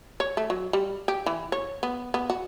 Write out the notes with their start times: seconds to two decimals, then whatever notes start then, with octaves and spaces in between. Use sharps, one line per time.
0.20 C#5
0.37 A3
0.50 F#3
0.73 G3
1.08 G4
1.26 E3
1.52 C#5
1.83 B3
2.14 B3
2.30 F#4